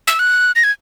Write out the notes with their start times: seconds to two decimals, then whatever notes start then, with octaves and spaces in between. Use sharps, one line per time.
0.07 E6
0.19 F#6
0.56 A#6
0.64 G#6